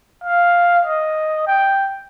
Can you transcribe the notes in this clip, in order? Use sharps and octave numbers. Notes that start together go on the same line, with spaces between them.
F5
D#5
G5